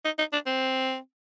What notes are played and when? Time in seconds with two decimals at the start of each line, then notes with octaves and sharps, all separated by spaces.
0.05 D#4
0.19 D#4
0.33 D4
0.46 C4